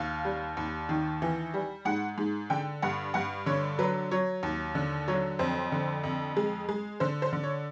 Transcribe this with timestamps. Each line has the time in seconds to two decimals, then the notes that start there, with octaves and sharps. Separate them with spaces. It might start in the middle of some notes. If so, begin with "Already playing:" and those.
Already playing: D#2 F5
0.25 G3
0.57 D#2
0.89 D#3
1.22 E3
1.54 G3
1.85 G#2 F#5
2.18 G#2
2.50 D3 G5
2.82 G2 F#5
3.14 G2 F#5
3.46 D3 C#5
3.79 F#3 B4
4.11 F#3 C#5
4.43 D#2
4.75 D3
5.08 F#3 C#5
5.39 F2 C5
5.72 D3
6.03 F2
6.36 G#3
6.69 G#3
7.00 D3 C5
7.22 C5
7.33 D3
7.44 C#5